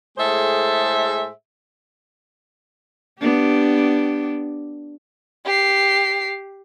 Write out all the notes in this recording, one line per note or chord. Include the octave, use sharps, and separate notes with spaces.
A2 G#3 G#4 A4 C5 E5
B3 D4 G4
G4 C7